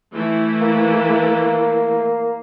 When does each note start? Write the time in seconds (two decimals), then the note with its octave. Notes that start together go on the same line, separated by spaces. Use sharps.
0.14 E3 A3 E4
0.61 A#3